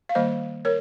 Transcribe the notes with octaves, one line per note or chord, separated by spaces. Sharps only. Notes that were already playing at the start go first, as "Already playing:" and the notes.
F5
D#3 G3 A#3 C5 D#5
A#4 C#5